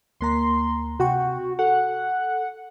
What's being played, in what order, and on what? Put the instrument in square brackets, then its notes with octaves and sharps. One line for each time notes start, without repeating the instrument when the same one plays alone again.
[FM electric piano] D2 A#3 A#5 [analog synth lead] C6
[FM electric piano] C3 G5 C#6 [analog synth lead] F#4
[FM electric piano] A4 [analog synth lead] F#5